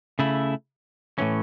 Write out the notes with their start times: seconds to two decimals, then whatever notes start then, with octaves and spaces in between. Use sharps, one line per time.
0.19 C#3 A3 E4
1.18 A2 E3 C#4